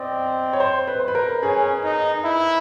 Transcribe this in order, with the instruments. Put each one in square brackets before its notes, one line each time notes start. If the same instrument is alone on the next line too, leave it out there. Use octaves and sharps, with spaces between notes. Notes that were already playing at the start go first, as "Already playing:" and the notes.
Already playing: [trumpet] C4 [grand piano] D5 D#5
[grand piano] C#5
C5
B4
C5
B4
A#4
[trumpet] C#4 [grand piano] G#4
[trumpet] D#4
E4